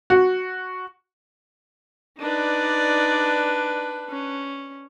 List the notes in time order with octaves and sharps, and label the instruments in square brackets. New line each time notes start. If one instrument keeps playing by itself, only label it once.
[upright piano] F#4
[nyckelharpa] D4 B4 [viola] D#4 D5
[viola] C#4